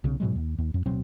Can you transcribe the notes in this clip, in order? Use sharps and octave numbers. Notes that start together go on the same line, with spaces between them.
B1 C#3
G#2 B2 F#3 G#3
D#2
D#2
F2
D1 B2 F#3 C4